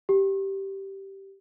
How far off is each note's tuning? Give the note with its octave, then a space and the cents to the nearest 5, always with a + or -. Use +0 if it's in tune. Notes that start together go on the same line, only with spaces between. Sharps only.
G4 -10